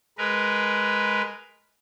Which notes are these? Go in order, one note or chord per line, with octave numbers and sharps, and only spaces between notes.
G#3 A#4 B4